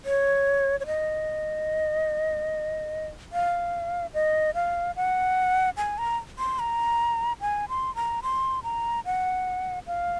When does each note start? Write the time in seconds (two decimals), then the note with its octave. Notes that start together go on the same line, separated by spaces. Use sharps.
0.05 C#5
0.80 C#5
0.86 D#5
3.33 F5
4.14 D#5
4.55 F5
4.96 F#5
5.77 G#5
5.98 A#5
6.38 C6
6.59 A#5
7.41 G#5
7.69 C6
7.96 A#5
8.23 C6
8.63 A#5
9.06 F#5
9.87 F5